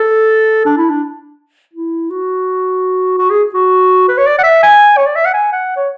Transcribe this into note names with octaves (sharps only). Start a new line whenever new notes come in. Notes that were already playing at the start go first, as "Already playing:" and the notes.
Already playing: A4
D4
E4
D4
E4
F#4
F#4
G#4
F#4
B4
C#5
D5
F#5
E5
G#5
C#5
D5
E5
F#5
G#5
F#5
C#5